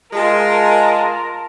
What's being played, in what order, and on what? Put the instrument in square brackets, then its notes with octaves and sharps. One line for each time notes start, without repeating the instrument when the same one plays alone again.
[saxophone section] G#3 [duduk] F4 [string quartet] A#4 [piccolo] A5